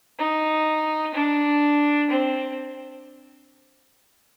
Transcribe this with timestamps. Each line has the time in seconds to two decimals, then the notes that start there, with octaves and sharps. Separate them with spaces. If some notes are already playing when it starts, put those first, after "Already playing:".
0.19 D#4
1.15 D4
2.10 C4